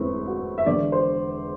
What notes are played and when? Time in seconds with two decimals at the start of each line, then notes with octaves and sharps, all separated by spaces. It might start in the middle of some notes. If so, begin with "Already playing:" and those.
Already playing: E1 E2 A3 B3 C4 E4
0.27 F#4
0.58 E5
0.66 E1 E2 D3 D5
0.92 C5